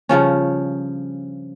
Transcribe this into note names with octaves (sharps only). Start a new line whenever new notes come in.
G2 C#3 F3 C#4